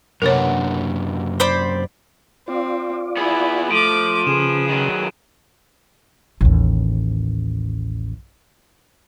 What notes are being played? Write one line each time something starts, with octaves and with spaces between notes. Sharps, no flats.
F#2 C3 A#3 B3 D4 A#4 B4 C#5
C5 D5 B5
C4 F4 D5
B3 E4 G#4
F3 A3 D6 D7 D#7
C#3 G#4 B4 E7
D#3 F#3
A1 D#2